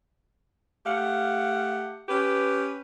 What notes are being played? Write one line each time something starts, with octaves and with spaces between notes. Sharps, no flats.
A3 G4 F5 F#5
C#4 G4 B4